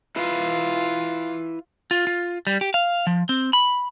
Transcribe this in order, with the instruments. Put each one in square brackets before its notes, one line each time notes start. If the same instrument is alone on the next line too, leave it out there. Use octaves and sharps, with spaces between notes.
[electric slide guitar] E4 B4 F5 [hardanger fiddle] F4
[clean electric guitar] F4
F4
G3
G4
F5
F3
C4
B5